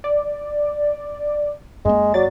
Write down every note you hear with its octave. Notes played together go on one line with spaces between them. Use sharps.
D5
F#2 G#3 A#3
F#3 D5 A6